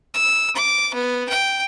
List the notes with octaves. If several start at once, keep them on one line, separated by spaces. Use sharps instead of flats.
E6
D6
B3
G5